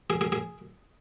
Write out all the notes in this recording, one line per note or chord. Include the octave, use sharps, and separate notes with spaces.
G#4
G#4
G#4